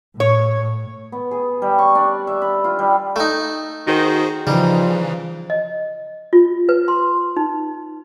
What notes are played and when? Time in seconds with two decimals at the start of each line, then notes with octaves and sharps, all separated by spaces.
0.20 A2 C#5
1.12 B3
1.31 G#4
1.62 G3
1.79 C#6
1.95 D4
2.27 E5
2.42 B5
2.64 F4
2.79 G3
3.16 A3 D#4
3.87 D#3 F#4 G#4 C5
4.47 C#3 E3 F3 G3 D#4
5.50 D#5
6.33 F4
6.69 B4
6.88 C6
7.37 D#4